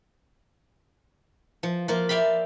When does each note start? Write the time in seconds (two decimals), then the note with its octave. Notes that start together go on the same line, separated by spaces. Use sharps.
1.63 F3
1.88 F3 A#3 F4
2.09 D5 E5 F5 G5 B5